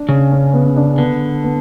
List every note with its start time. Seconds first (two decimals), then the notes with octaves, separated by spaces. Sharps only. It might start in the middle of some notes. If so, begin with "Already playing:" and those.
Already playing: D4
0.09 C#3 C#4
0.32 C#4
0.53 B3
0.76 D4
0.98 D3 B3
1.44 B3